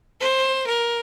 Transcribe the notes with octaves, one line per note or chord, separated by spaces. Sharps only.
C5
A#4